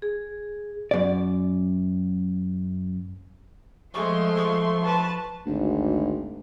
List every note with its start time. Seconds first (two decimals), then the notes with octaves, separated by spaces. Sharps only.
0.02 G#4
0.91 F#2 D5
3.94 F3 G#3 A3 C6 C#6
4.37 C#6
4.85 B4 A5
5.47 G#1 D2